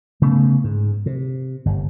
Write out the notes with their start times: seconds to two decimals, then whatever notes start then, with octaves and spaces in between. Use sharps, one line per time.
0.22 C#3 A3 B3
0.64 G#2
1.06 C3
1.66 G1